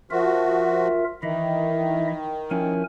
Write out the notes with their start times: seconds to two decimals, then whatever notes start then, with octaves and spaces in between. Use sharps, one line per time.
0.11 F3 F4 F#4 A#4 E5
1.23 D#3 E3 E4 D#5 E5
2.51 F3 C#4 E4 A#4 G#5